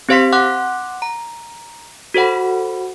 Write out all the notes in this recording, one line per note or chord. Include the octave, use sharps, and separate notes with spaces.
C4 G4 C5 F5 C6 B6
F#5 C6 D6 F#6
A#5
F#4 A4 C5 F#5 B5